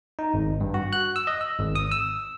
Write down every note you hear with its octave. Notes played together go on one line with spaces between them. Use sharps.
D#4
G#1
G2
F#4
F#6
E6
D#5
E6
G#1
D#6
E6